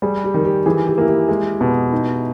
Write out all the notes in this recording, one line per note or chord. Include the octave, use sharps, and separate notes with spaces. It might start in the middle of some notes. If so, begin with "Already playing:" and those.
G3 G#4
G4
D#3
G4
E3 G#4
G4
A#3 E4
G4
G#3
B2
D#4